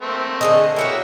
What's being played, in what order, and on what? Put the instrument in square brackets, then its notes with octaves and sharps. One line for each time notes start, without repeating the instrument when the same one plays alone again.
[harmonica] A3 A#3 C4
[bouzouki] D3 G#4 D#5
[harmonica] A#3 E4 [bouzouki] F#4 C#5 G5